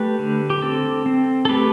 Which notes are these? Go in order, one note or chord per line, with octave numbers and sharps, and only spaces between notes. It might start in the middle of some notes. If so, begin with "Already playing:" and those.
Already playing: A3 G4 B4
D3
G4
C4 A4
C4
A4
A3 G4 B4